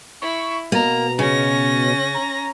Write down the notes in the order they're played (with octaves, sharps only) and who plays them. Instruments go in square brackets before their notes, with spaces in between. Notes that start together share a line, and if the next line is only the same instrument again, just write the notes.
[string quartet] E4 [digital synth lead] C#6
[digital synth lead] B2 [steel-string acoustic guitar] A#3 [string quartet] A#5
[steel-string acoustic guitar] C#3 [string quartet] C#4 A#6
[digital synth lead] A#5